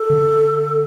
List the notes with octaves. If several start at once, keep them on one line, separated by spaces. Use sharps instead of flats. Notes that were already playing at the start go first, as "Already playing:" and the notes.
Already playing: A4
D3